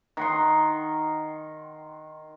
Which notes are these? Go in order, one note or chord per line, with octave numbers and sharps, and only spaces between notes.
D#3 F#5 C6